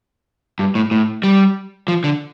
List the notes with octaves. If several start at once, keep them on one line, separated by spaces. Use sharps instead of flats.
G2
A2
A2
G3
F3
D3